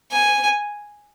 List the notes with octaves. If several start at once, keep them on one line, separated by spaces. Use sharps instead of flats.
G#5